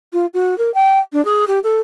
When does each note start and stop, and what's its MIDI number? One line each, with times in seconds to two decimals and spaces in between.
0.13 0.26 65
0.34 0.58 66
0.58 0.73 70
0.74 0.99 79
1.13 1.24 62
1.25 1.45 68
1.48 1.59 67
1.64 1.80 69